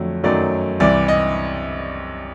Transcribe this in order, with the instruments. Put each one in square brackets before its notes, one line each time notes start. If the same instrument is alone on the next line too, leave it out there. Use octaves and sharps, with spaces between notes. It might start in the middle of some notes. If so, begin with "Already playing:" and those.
Already playing: [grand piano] F2 D3 F#3 A3
F#2 D#3 F#3 A3 D5
C2 C3 E3 D5
D#5